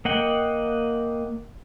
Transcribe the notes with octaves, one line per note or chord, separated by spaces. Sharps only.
A#3 D#5 F#5 G5